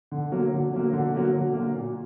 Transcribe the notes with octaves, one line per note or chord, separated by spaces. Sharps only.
D3
F#3 A#3
D3
F#3 A#3
D3
F#3 A#3
D3
F#3 A#3
A#2